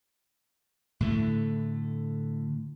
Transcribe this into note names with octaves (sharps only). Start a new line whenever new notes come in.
A2 D3 A3